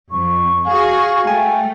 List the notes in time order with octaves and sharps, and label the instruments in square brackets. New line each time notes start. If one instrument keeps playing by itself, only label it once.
[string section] F2 [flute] C#6
[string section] F#4 G#4 [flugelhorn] F5
[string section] A3 [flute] G5 [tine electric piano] G#5